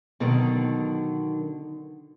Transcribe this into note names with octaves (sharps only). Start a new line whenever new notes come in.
B2 D3 D#3 F#3